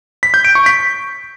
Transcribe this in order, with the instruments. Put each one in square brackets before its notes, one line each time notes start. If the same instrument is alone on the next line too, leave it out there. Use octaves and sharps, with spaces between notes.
[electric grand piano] B6
G6
D7
C#6
B6